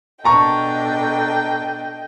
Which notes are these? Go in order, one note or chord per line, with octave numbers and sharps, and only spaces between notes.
B2 D4 A4 D#5 G5 A5 A#5 C#6